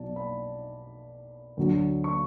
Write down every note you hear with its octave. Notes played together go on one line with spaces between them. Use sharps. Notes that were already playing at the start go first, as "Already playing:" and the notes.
Already playing: B1 B2 F#3 D5 A5
B5
D2 D3 F#3
C#6